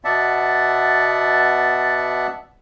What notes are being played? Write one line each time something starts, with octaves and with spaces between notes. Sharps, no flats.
B2 B3 D5 E5 F#5 A5